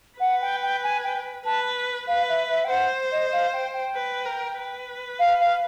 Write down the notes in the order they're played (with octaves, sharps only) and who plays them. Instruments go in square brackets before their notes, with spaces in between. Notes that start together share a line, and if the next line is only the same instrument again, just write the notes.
[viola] B4 [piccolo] F#5
[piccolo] G5
G5
G#5
G5
[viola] B4 [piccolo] A5
[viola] B4 [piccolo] F5
[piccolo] E5
E5
G5
[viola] C5 [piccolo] F#5
[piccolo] D#5
F5
G5
G5
[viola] B4
A#4
B4
[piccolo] F5
F5